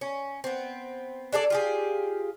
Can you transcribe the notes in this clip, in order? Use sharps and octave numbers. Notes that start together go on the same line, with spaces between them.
C#4
B3 C4
D4 G#4 A4 D5
F4 G4 G#4